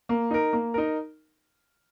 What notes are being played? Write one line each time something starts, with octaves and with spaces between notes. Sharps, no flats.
A#3
D#4 A#4
A#3
D#4 A#4